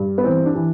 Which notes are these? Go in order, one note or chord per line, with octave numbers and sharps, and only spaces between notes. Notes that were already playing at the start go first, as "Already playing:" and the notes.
Already playing: G2
B3
E3 C4
D4
E3